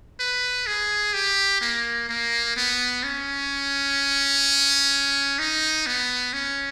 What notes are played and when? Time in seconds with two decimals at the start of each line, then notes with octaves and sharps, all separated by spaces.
0.19 B4
0.66 G#4
1.14 G4
1.61 A#3
2.09 A#3
2.56 B3
3.03 C#4
5.39 D#4
5.86 B3
6.33 C#4